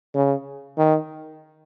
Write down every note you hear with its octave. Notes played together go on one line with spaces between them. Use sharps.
C#3
D#3